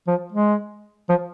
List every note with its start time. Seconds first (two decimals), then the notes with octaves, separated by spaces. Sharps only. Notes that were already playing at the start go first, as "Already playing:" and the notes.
0.07 F3
0.32 G#3
1.09 F3